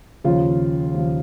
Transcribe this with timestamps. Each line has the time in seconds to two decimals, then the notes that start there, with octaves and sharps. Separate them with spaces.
0.24 D#2 C#3 F3 F4
0.94 D#2 C#3 F3